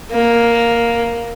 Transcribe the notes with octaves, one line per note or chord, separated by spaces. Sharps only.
A#3